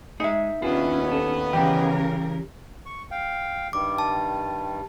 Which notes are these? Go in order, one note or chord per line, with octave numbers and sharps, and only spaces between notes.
G#3 D#4 G#4 E5
D#2 B3 C#4 D4 E4 F4 G#4
A4
C#3 E3 G3 G4 A#4
C#6
F5 G5
G2 D#3 G3 D6
A5